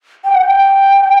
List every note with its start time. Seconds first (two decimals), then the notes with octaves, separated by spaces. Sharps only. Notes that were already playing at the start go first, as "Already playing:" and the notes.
0.24 G5
0.34 F#5
0.43 G5